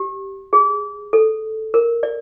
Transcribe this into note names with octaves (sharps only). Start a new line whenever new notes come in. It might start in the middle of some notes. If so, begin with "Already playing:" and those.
Already playing: G4
G#4
A4
A#4
D5